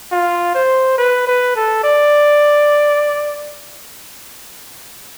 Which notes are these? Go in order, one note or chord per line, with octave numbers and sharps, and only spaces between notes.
F4
C5
B4
B4
A4
D5